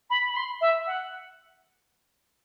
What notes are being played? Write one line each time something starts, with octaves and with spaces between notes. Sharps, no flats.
B5
B5
C6
E5
F#5